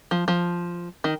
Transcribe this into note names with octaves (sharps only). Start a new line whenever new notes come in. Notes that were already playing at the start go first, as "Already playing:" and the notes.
F3
F3
D#3